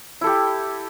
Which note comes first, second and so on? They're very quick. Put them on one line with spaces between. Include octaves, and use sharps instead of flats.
E4 A4 G4